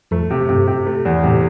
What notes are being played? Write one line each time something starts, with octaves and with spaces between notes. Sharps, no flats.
F2 F3 A3
C3
G2 C3
C3
A3
E2
A2 C3